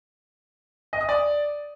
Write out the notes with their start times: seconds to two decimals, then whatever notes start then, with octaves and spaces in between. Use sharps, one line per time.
0.93 D#5
1.01 D#6
1.09 D5